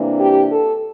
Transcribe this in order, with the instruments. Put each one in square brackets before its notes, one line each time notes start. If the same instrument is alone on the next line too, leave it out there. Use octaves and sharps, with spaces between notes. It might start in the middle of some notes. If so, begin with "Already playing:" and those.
Already playing: [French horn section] C3 E3 A#3 D4
G4
A4